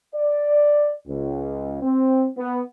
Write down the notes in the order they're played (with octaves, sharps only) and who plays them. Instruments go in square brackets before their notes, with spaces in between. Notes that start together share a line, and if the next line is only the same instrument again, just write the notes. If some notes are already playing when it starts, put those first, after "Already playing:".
[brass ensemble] D5
C#2
C4
B3